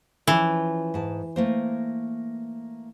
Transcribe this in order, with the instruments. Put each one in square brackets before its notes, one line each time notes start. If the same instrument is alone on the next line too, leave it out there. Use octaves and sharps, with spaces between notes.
[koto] E3 [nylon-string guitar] F3 C#4
[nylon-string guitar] G#2 A5
A3 A#3 C5